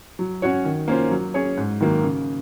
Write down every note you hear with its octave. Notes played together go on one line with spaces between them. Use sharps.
F#3
C#4 F#4 C#5
D#3
A#3 C#4 F4 C5
F#3
C#4 G#4 C#5
G#2
D#3 F#3 A#3
C#3